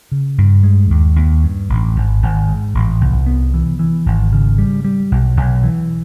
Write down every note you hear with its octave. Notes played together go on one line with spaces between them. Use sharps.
C#3
G2
G#3
D#2
D#2
G2
A1
G#1
G#1
G#2
A1
C2
B3
E3
E3
G#1
C#3
G3
G3
B1
B1
E3